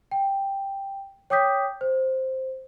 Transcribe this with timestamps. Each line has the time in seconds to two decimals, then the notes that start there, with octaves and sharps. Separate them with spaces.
0.11 G5
1.30 C#5 G5 D6 D#6 G6 B6
1.81 C5